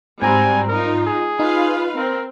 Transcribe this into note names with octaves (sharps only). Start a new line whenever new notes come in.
G#2 G3 C4 F#4 G#5 A#5
D#4 F4 A#4
G#4
D#4 F4 B4 F5
C4 A#4